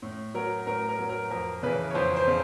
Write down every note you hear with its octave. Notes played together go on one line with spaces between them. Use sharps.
A2
F#3 A#4
A2 A#4
A#4
F#3
A#4
F2 A#4
C#3 E3 B4
C#5
F2 C5
C5
C#3